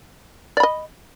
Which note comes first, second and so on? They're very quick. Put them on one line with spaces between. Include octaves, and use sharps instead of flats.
D5 B5 D#5